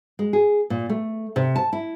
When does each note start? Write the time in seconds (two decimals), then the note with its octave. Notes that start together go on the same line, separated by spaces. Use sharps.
0.19 G#3
0.33 G#4
0.70 A#2
0.90 A3
1.36 C3
1.56 A5
1.73 E4